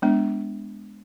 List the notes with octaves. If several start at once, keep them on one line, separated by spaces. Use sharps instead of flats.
G#3 B3 D4